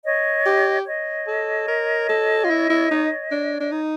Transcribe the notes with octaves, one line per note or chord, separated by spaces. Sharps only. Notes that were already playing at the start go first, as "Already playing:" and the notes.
C#5 D#5
G4
C#5 D#5
A4
A#4
A4
F4
E4
E4
D#4
D4
D4
D#4